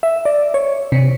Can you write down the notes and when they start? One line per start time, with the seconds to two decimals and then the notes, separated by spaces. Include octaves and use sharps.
0.03 E5
0.25 D5
0.54 C#5
0.92 C3